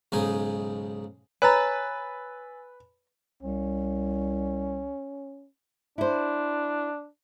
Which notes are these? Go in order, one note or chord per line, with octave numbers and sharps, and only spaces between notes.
B1 G#2 C#3 D#4 G#4
B4 C#5 G#5 A#5 E6 A6
C2 C#4
D4 E4 C5